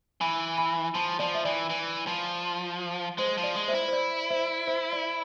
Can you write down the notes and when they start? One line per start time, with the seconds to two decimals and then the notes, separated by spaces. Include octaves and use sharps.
0.21 E3 G#5 B5
0.58 G#5 B5
0.95 F3 A5 C6
1.19 F3 D5
1.35 E5
1.45 E3 D5
1.70 E3
2.07 F3
3.18 G#3 C5
3.38 F3
3.44 D5
3.55 G#3
3.68 C5 E5
3.74 E4
3.88 C5
3.93 D5
4.30 C5 E5
4.67 C5 E5
4.92 D5